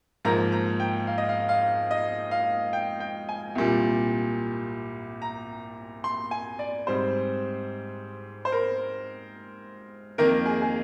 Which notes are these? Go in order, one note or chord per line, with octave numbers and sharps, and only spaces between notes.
G#2 F3 A#3 A#5
A#5
G5
F5
D#5
F5
F5
D#5
F5
G5
G5
G#5
C2 A#2 G3
A#5
C6
G#5
D5
G#2 G3 C4 C5
C5
A#4
F2 D#3 A#3 A#4
G#4
G#4